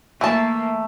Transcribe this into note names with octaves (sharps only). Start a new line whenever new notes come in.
E3 A3 A#3 A5